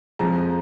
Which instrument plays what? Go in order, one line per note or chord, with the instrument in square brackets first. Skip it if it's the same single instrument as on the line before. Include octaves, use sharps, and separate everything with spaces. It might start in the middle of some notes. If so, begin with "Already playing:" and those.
[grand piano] F2 F3 G#3 A#5